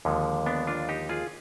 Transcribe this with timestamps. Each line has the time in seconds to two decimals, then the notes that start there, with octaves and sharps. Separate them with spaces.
0.05 D#2 D3 F3 G#3
0.46 B3 D4
0.67 D4 F4
0.89 D#4 G4
1.09 F4 G#4